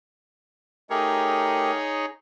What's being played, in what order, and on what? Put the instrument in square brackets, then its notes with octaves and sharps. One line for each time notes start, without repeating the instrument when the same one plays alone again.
[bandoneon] A3 G4 A#4 [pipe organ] D#4 G#4 C#5